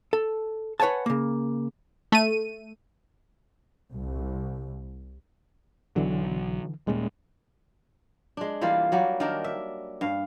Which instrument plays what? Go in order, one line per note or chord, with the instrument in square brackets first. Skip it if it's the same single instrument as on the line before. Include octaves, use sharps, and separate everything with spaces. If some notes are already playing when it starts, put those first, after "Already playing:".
[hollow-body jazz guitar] A4
B4 C#5 F#5 G#5 A5
C#3 A#3
[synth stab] A3 D#7
[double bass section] C2
[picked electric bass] B1 F#3 [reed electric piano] D3 E3
[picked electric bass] D#1 A#2 [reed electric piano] G3 G#3 C#4
[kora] G#3 D4
E3 G3 A#3 F4
F#3 G3 A#3
D#3 D4 A#4
E5
G2 F5